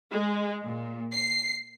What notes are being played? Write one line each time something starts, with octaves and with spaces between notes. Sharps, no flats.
G#3
A#2
C7